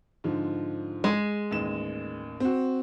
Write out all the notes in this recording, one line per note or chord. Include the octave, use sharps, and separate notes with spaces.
G#2 D3 F3
G#3
A1 D#2 E7
C4 F#4